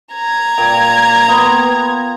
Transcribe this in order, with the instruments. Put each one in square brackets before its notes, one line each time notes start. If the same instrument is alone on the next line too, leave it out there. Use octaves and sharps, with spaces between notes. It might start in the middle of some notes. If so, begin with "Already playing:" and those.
[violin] A#5 G#6
[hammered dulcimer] A#2 A#3 G5
B3 F4